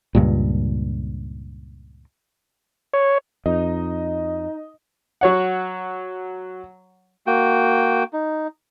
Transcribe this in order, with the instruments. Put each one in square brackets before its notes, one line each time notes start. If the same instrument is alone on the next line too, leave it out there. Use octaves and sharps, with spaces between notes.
[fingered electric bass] C#2 G2 A#2
[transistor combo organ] C#5
[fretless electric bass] F2 [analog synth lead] D#4 [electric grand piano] D#5
[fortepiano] F#3 C#5 F#5
[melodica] A#3 F#4 G5
D#4